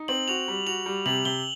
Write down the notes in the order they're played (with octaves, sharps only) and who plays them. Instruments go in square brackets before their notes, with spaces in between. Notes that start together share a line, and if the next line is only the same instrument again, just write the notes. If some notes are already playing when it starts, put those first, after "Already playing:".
Already playing: [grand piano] D#4
[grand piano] C4 [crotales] F#7
[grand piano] F#4 [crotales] F7
[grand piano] G3
[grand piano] F#4 [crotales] F7
[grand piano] G3
[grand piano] C3 [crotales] F#7
[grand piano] C3 [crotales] G7